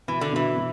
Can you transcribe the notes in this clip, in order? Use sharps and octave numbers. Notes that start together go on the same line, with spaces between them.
B2 E3
D3
B2 E3
B2